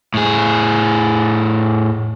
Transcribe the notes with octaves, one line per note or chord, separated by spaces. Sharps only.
A2 G#4